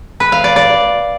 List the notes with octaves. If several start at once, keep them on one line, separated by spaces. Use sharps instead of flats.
B4
F5
D5
D5